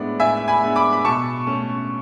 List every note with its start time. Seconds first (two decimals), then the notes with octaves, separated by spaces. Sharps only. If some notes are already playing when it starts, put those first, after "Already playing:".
Already playing: A2 G#3 B3 D4 D5
0.20 A2 E5 G#5
0.48 G#5 B5
0.63 G#3 B3 D4
0.76 B5 D6
0.93 B5
1.05 B2 A5 C#6
1.47 A3 C#4